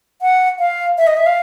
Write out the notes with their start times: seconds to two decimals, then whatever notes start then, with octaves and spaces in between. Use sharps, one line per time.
0.22 F#5
0.59 F5
0.98 E5
1.07 D#5
1.17 E5
1.26 F5